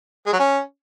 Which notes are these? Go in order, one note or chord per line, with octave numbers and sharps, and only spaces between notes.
G#3
F#3
C#4